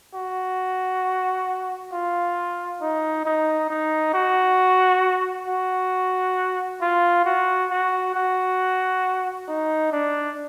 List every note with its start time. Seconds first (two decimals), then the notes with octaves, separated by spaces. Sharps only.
0.15 F#4
1.93 F4
2.81 D#4
3.25 D#4
3.70 D#4
4.14 F#4
5.48 F#4
6.81 F4
7.25 F#4
7.71 F#4
8.14 F#4
9.48 D#4
9.92 D4